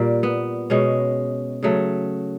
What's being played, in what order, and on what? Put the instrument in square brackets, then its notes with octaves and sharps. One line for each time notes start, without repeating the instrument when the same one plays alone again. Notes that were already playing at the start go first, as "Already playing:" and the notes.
Already playing: [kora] A#2 G3 A#3
B3
B2 G#3 C#4
C#3 F#3 A3